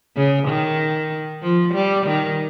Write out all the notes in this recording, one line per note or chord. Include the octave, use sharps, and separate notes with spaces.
C#3
D#3
F3
G3
D#3